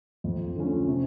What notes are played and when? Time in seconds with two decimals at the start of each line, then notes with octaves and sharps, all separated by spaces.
0.24 F2
0.56 D3 F3 A3 C#4
0.87 C3